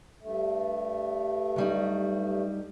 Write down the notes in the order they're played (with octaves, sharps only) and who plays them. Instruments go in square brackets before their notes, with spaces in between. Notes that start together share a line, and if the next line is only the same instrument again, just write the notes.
[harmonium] G2 A3
[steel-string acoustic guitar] F#3 G3 D#4